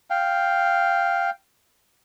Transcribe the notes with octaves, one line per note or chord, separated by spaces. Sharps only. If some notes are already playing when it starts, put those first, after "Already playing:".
F5 G5